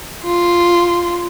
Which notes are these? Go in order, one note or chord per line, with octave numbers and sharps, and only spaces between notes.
F4